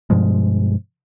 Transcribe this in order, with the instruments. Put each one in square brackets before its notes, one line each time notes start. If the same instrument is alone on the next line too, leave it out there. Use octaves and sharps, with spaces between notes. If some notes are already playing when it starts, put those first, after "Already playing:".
[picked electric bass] G2 B2 F3 G#3